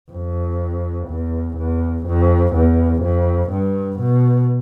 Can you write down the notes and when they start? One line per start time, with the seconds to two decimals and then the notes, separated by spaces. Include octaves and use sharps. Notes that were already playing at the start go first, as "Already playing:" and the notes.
0.11 F2
1.08 E2
1.57 E2
2.06 F2
2.55 E2
3.02 F2
3.51 G2
4.00 B2